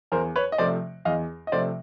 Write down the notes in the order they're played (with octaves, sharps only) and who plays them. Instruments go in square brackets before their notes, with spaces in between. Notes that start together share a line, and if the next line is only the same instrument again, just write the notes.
[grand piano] E2 A#4 C5
B4 C#5
D#5
C3 F3 A3 C5 D5
E2 D#5 F5
D#5
C3 F3 A3 C5 D5